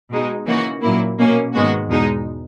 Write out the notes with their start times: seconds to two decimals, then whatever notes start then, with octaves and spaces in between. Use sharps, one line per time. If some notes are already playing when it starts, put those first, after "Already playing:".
0.11 B2 G#3 D#4
0.46 C#3 E3 A#3 D#4 F#4
0.82 A#2 F#3 A#3 E4
1.18 B2 A#3 C#4
1.54 G#2 D#3 G#3 B3 F#4
1.89 E2 B2 G#3 D#4